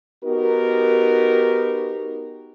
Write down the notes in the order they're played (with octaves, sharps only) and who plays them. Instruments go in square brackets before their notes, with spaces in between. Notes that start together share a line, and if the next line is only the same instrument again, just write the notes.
[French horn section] B3 D#4 F#4 G4 A#4